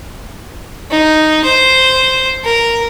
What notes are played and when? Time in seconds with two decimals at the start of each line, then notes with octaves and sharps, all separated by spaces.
0.91 D#4
1.44 C5
2.44 A#4